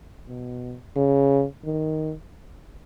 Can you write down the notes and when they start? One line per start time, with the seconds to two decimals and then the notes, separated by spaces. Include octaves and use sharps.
0.28 B2
0.96 C#3
1.65 D#3